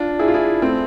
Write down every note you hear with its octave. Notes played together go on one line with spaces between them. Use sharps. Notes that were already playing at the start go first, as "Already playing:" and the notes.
Already playing: D4 F4
E4 G#4
F4
E4 G#4
A3 C4